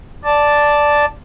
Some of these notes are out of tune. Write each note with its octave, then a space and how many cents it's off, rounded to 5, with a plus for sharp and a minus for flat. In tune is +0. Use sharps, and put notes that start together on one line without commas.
D5 +0 A5 +0